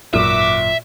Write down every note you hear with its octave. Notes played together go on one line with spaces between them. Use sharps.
G#1 F#2 A#2 F#4 B4 E5 D6